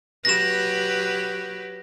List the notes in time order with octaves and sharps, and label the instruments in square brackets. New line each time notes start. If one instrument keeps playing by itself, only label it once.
[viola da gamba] F#3 G4 B4 [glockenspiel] A#6 E7